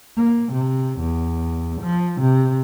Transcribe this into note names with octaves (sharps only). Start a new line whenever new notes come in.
A#3
C3
E2
F3
C3